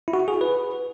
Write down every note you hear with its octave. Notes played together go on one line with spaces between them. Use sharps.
E4
F#4
G#4
B4